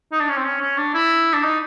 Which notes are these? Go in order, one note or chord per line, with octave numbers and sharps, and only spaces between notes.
D#4
D4
C#4
C4
C#4
C#4
D4
E4
D4
D#4